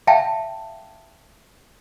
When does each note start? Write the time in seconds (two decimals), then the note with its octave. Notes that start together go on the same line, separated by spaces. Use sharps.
0.07 E5 F5 G5 A5